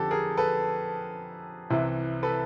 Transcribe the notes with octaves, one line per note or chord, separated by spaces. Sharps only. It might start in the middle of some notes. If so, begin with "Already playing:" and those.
Already playing: F2 D3 G4 A4
G#4 A#4
A4 B4
C2 C3 E3
A4 B4